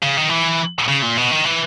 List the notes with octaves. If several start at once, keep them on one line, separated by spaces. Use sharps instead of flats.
C#3
D#3
E3
C#3
A#2
B2
D#3
E3